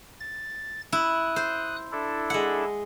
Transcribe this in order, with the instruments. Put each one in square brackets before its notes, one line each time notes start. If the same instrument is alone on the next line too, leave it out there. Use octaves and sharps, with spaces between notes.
[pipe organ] A6
[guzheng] E4 [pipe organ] D#6 F#6
[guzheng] C5
[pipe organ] D4 E4 A4
[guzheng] G#3 F#5